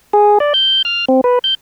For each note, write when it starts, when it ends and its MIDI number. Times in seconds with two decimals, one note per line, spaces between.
0.13 0.38 68
0.40 0.53 74
0.54 0.82 91
0.85 1.05 89
1.08 1.21 60
1.24 1.39 71
1.44 1.54 91